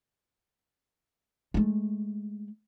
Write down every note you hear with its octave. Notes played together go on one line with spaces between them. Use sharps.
G#3 A3